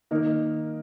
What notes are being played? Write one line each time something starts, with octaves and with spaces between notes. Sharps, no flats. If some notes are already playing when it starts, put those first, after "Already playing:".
D#3 A#3 D#4